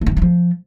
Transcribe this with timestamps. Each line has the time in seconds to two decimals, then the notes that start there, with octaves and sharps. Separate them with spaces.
0.01 A3
0.07 D#3
0.12 B3
0.17 E3
0.22 F3